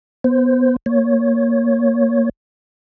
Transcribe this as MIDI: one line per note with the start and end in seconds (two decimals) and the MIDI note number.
0.24 0.76 59
0.24 0.76 72
0.86 2.29 58
0.86 2.29 73